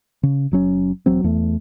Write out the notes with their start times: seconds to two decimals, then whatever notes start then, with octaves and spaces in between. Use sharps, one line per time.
0.23 C#3
0.51 F#1 F#3 C#4
1.06 E1 F#3 C4
1.24 E2 A3